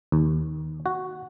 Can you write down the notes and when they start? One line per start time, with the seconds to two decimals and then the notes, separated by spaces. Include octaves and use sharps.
0.12 D#2
0.86 F#4